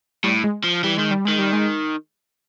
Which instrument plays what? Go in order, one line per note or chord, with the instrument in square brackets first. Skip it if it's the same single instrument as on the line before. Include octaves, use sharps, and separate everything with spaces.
[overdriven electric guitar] A2 [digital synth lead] G3
[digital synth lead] G#3
[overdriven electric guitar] F3
[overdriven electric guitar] E3 [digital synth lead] G3
[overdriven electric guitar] D#3 [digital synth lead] G#3
[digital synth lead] G3
[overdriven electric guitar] D#3 [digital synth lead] G#3
[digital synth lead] G3
G#3